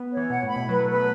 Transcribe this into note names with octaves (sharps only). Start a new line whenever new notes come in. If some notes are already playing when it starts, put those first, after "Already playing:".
Already playing: B3
C#5
E3
B2 F#5
A2
B5
B2
F#3 B4
A3
B4
B3